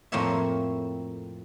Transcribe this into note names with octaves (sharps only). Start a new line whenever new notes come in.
F2 A2 A#3 C4 C#5 E5